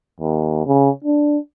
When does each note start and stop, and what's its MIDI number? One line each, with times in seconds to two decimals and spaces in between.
0.21 0.64 39
0.66 0.90 49
1.04 1.38 62